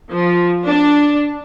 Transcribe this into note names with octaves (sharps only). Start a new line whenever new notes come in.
F3
D4